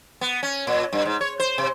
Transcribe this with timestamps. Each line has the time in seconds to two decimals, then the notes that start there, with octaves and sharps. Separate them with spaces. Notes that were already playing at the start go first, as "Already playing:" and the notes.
0.21 B3
0.43 C#4
0.67 A#2
0.93 G2
1.05 G#2
1.21 C#5
1.40 C5
1.58 C3